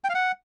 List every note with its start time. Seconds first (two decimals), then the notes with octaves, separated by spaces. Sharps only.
0.04 G5
0.09 F5
0.15 F#5